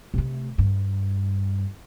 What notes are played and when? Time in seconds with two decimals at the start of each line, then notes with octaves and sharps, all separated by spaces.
0.14 C3 A3
0.58 G2